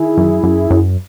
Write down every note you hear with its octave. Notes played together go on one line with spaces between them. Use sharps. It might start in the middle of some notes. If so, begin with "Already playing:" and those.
Already playing: D#3 E4 G#4
F#2
F#2
F#2